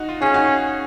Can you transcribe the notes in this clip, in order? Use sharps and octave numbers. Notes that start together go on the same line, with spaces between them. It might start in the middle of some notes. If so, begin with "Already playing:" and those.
Already playing: D#4 F#4
F4
C#4 G#4
D#4 F#4